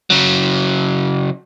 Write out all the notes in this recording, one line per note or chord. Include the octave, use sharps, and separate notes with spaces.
C#3 F#3